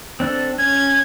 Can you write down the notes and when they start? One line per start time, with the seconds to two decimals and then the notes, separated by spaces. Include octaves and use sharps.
0.20 C4 D4 A4
0.58 C#4 G#6